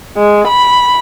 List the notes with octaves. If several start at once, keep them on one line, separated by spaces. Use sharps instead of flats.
G#3
B5